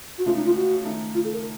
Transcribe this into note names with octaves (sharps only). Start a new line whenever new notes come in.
F#4
C#2 C#3 A3 F4
D#4
F4
F#4
D#3 A3 D#4
F4
A4
A#4